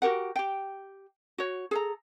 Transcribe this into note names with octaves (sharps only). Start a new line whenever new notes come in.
F#4 G4 A#4 F#5
G4 G5
F#4 C#5
G#4 A4 A#5